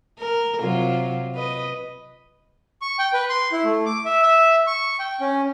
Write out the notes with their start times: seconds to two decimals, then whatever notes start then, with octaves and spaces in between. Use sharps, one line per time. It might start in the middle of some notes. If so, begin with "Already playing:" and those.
0.19 A#4
0.60 C3 F#3 F4
1.35 B4 D#5
2.82 C#6
2.99 G5
3.13 B4
3.29 C6
3.52 E4
3.64 A3
3.86 D6
4.05 E5
4.23 E5
4.67 C#6
4.99 G5
5.20 C#4